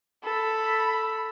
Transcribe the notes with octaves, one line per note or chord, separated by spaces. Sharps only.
A4 B5